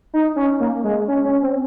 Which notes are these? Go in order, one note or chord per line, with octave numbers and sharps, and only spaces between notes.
D#4
C#4
A#3
G#3
C#4
C#4
C4